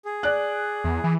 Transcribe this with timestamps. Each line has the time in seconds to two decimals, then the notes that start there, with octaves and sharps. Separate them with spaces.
0.05 G#4
0.23 D5 F#6
0.84 E2
1.04 E3